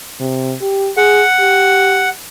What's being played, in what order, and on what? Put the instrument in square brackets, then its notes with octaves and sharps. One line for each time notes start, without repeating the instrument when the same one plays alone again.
[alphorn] C3
G4
[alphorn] G#4 [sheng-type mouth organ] F#5
[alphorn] G4